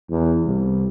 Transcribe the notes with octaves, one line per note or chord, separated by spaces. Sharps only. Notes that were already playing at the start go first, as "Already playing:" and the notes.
E2
C2